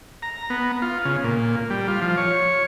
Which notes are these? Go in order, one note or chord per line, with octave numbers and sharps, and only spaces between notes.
A#5
B3
F4
C#3
A#2
G3
F4
F3
C#5